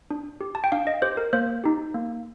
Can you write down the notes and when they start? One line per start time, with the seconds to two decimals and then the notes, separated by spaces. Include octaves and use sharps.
0.10 D4
0.41 G4
0.55 A5
0.64 G5
0.72 D4 F5
0.87 D#5
1.02 G4 C5
1.17 A#4
1.33 A#3 C5
1.64 D#4 G4
1.94 A#3